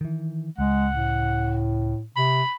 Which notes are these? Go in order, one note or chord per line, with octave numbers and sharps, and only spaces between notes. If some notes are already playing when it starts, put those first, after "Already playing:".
D#3 E3
C#2 G#3 F#5
A2
C3 B5